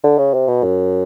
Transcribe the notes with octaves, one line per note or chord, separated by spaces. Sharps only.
D3
C#3
C3
B2
F#2